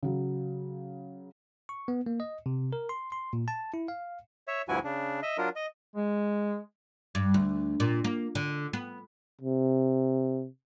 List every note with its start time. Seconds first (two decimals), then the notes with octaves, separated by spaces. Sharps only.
0.03 C#3 F#3
1.69 C#6
1.88 B3
2.06 A#3
2.20 D#5
2.46 C3
2.73 A#4
2.89 C6
3.12 C6
3.33 A#2
3.48 A5
3.74 E4
3.88 F5
4.48 C#5 E5
4.68 D2 G2 F3 E4 F#4 G#5
4.84 C#3 D4
5.23 D#5 E5
5.38 F#3 D4 F4 A#4
5.56 D#5
5.96 G#3
7.15 G2
7.34 D2
7.80 A#2
8.04 A#3
8.35 D3
8.73 B3
9.41 C3